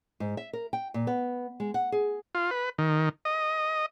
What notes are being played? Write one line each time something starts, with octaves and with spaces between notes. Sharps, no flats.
G#2
E5
A#4
G5
A#2
B3
G#3
F#5
G#4
F4
B4
D#3
D#5